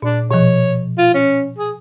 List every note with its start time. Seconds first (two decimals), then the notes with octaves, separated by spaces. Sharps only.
0.02 A#2 D4
0.31 B2 F3 C#5
0.98 F4
1.14 C#4
1.58 G#4